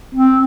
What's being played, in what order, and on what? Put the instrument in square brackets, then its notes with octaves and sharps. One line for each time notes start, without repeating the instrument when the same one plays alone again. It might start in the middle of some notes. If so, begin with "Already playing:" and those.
[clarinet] C4